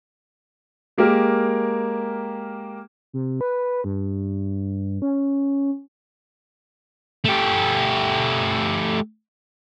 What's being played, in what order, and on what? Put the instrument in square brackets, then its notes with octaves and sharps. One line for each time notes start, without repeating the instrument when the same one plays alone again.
[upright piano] G#3 A#3 G4 A#4
[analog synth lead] C3
B4
G2
C#4
[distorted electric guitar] A3 G4